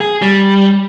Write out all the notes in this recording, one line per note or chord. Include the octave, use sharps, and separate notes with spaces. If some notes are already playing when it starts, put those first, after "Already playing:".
G#4
G3